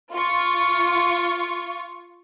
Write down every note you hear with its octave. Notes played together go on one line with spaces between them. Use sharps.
F4 C#6